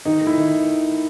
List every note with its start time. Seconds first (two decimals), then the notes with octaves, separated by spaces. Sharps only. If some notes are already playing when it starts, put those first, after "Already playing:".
0.05 D#3 D#4
0.21 A3
0.27 E4
0.38 D#3